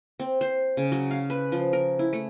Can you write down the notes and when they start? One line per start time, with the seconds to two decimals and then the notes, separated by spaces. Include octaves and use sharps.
0.20 C4
0.41 C5
0.77 C#3
0.92 F#3
1.11 F5
1.30 B4
1.52 F3
1.73 A#4
1.99 E4
2.13 A3